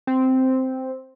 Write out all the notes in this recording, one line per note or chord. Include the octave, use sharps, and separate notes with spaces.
C4